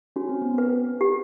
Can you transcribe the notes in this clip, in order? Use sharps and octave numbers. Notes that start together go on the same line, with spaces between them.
C#4 F#4
C4
B3
C4 B4
G4